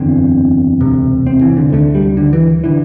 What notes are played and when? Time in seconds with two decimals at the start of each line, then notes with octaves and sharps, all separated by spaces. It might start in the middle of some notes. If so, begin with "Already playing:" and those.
Already playing: F#1 E2 D3 C4
0.81 E1 D2 C3
1.27 C4
1.41 E3
1.57 D3
1.72 D2 D3 A3
1.95 G3
2.17 D3
2.33 E3
2.64 D3 E3